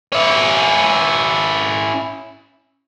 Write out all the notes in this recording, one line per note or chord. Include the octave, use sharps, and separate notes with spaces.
C#4 E4